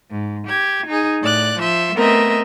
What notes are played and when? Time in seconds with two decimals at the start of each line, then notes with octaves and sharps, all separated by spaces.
0.12 G#2
0.48 G4 G#6
0.87 D#4 G#4
1.22 A2 D5 F#6
1.59 F3 E5 C6
1.96 A3 B3 C4 A#4 D#5 E5